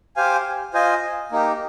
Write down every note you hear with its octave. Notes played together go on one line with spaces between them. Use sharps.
G4 C5 F5 G#5
F4 C5 D#5 G#5
A#3 D#4 G4